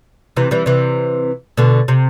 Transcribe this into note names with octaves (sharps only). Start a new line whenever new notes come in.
C3 E3
E3 G3
C3 E3
B2 D3
C3